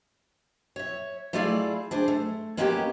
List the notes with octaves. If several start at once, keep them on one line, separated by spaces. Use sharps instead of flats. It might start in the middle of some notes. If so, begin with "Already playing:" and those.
C#5 E5
A3 E4 F4 G#4 D5 F5
D4 G#4 C5
A3
G#3 A#3 B3 C#4 F#4 G4